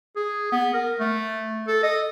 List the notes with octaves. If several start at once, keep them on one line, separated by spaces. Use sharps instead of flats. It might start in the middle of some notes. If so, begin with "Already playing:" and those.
G#4
B3
A#4
A3
A4
D#5